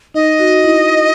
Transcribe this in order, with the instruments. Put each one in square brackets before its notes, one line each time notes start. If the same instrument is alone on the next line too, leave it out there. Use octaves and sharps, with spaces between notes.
[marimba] D#4 [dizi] D#5
[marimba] F#4
E4